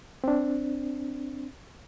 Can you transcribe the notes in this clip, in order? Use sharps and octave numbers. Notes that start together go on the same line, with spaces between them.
C4 D4